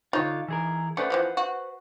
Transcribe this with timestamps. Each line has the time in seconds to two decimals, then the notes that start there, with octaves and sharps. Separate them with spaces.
0.13 D3 D#4 F4 C#5
0.48 E3 G#4 A#4
0.97 A3 C#4 D4 B4 C5 F#5
1.10 E3 F3 G3
1.37 F#4